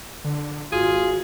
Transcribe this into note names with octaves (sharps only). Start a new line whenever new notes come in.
D3
G#1 F4 F#4 G#4